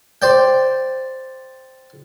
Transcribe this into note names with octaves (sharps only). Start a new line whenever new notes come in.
C5 D5 G5